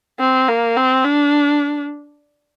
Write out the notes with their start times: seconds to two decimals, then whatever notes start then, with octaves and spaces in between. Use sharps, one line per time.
0.20 C4
0.48 A#3
0.76 C4
1.04 D4